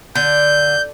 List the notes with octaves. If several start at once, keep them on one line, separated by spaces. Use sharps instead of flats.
D3 G6